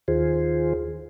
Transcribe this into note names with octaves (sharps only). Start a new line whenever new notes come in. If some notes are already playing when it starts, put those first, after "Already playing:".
D#2 D#3 F4 G#4 C5